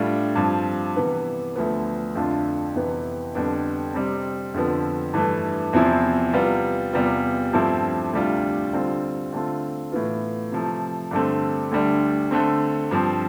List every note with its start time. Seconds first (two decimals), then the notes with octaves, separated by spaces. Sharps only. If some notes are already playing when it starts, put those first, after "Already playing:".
Already playing: A2 G3 D4 F4
0.35 G2 F3 C4 F4
0.96 C3 E3 B3
1.56 D2 D3 F3 B3
2.15 F2 D3 A3 D4 F4
2.76 F2 C3 E3 B3
3.35 F2 D3 G3 B3 D4
3.94 C3 G3 C4
4.54 F2 D3 F3 B3
5.14 G2 E3 A3
5.73 E2 C3 F3 C4 E4
6.34 C3 G3 B3 F4
6.93 E2 C3 G3 B3 F4
7.53 G2 F3 A3 C4 E4
8.13 D2 C3 G3 D4 F4
8.73 D3 G3 C4 F4
9.32 D3 A3 C4 F4
9.92 A2 E3 B3 F4
10.52 C3 F3 A3
11.11 G2 D3 A3 C4
11.71 D2 D3 G3 D4
12.31 D3 A3 C4
12.91 G2 F3 C4